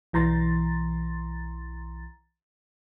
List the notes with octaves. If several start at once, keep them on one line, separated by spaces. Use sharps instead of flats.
B1 E3 A#5 C6 A6